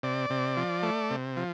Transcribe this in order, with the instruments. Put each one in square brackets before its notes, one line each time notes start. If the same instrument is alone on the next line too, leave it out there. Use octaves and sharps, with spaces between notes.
[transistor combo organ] C3 D5
C3
F3
A3
C3
F3